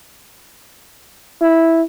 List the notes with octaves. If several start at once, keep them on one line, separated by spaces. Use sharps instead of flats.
E4